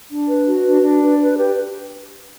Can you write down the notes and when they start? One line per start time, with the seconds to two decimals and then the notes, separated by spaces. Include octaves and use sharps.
0.10 D4
0.29 B4
0.47 F#4
0.65 D4
0.83 D4
1.02 B4
1.20 B4
1.38 G4